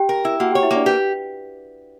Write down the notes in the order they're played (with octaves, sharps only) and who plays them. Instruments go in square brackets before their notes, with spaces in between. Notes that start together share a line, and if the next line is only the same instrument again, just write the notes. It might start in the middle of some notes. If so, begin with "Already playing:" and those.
Already playing: [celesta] G4 G5
[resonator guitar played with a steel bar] A#4
E4
[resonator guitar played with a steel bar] A#3 [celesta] F#4 F#5
[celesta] G4 G5
[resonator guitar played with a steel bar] C#5
[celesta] E4 E5
[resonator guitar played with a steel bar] A#3 [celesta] D4 D5
[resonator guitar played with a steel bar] G4 [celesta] B4